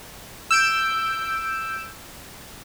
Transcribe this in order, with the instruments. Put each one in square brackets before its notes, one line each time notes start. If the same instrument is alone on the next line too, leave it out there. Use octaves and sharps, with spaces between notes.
[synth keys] E6 G6 D7